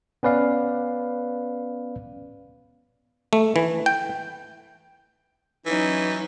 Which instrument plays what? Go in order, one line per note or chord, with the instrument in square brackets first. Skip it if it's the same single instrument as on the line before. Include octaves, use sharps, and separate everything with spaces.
[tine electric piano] B3 C#4 B4 D5 F5
[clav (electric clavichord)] A3
E3
G5
[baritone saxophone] E3 [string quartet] F#3 C#4 [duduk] D#4